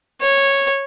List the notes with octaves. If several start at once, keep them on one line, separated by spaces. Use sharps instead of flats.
C#5